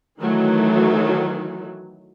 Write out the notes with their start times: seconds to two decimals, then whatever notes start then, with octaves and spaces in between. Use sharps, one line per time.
0.20 D#3 E3 F#3 A3